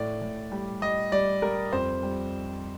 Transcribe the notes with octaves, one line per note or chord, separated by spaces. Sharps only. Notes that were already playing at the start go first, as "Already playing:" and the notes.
Already playing: A2 D5
A2
G3
G3 D#5
G3 D5
G3 A#4
F2 C5
G3